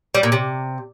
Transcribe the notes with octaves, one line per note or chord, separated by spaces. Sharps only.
G3
A#2
C3